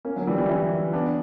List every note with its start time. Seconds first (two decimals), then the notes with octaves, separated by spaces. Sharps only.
0.05 A#3 C#4
0.16 D3 F#3
0.27 E3 G3
0.38 E3 G3
0.49 C#4 E4
0.93 B3 D4